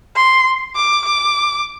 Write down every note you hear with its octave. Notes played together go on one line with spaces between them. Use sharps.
C6
D6
D6